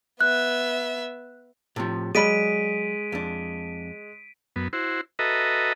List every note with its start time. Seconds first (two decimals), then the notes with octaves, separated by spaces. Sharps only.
0.21 B3 E5 F#6
1.76 A2 C3 F3
2.15 F#3 G#3 D5 B5 B6 D7 D#7
3.12 F2 D4
4.56 F#2 B3
4.73 E4 F#4 C5
5.19 F#4 A4 B4 D#5 E5 A#5